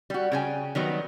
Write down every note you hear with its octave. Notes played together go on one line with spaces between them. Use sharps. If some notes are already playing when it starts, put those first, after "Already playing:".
G3 F#4
C#3 G5 G#5
D#3 F#3 G3 B3